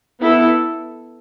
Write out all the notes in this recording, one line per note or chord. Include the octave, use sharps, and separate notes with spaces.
B3 E4 A4